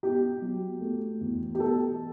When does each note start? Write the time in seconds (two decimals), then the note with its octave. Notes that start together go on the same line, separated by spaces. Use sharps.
0.03 B2 G4
0.42 F#3
0.81 A3
1.21 E2
1.55 G4
1.60 B2 A4